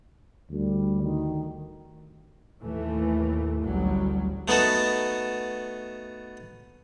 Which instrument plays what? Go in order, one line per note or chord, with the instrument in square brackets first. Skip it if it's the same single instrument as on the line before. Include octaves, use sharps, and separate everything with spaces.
[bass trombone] D2 [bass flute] G3
[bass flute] D#3
[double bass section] D#2 A2 E3 A3
A1 D2 F#3 G3
[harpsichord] A3 B3 D#4 F#4 A4